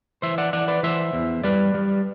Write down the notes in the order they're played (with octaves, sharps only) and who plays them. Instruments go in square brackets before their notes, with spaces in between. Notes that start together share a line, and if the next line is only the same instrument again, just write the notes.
[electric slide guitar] E3 C5 E5
D5 F#5
E3 D5 F#5
B4 D5
E3 C5 E5
E2
G3 B4 D5
G3